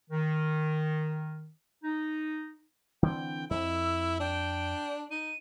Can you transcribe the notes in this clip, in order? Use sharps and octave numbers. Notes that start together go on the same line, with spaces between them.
D#3
D#4
D3 E3 C4 G5
F2 E4 E6
D4 G5
D#4 D#7